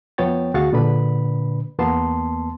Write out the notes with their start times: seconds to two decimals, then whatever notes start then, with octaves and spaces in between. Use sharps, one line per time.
0.18 F2 F3 B3 C#5 G5 A6
0.54 D2 F#4 G#4 F5 C#6 A6
0.73 A#2 D3 D4 B4 B5
1.79 E2 A#3 B3 A5 C6